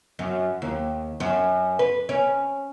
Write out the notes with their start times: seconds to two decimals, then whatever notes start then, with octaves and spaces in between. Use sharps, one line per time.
0.19 F#2
0.62 D#2
1.20 F#2
1.79 B4
2.09 C#4